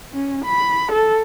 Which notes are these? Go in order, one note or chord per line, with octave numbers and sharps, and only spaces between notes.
C#4
B5
A4